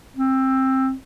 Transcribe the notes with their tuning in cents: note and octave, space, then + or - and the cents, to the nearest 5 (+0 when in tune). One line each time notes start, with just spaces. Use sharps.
C4 +15